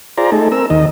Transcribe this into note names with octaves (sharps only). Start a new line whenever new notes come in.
F4 G#4 C5 D5 A#5
A3 D#4 G#4 A4
C4 A#4 E6
D#2 D#3 D#5